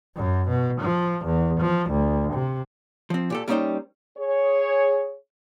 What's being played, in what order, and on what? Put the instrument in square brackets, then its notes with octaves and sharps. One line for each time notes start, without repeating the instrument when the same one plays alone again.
[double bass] F#2
B2
F3
E2
F3
D2
C3
[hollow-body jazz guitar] F3 C4
A#2 G4 A4
G3 A#3 C#4 D#4 C5 G5
[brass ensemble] G#4 C#5